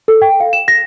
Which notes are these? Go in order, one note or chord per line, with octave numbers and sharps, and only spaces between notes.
A4
G5
F5
E7
A#6